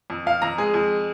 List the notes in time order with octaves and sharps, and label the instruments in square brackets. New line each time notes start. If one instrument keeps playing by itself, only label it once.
[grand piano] F2
F2 F5
F2 A#5
G#3 G#4
F2